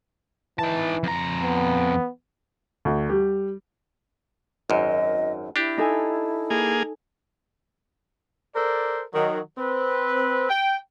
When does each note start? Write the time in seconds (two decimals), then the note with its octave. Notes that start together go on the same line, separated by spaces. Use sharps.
0.59 E3 D#4 A5
1.03 F2 A#5
1.43 B3
2.85 D2
3.10 G3
4.70 G#1 F#2 D#5
5.56 D4 E4 G4
5.78 D#4 A4 G#5
6.50 A#3 G#4
8.55 A4 A#4 C5 D5
9.13 D#3 F#3
9.57 C4 B4
10.49 G5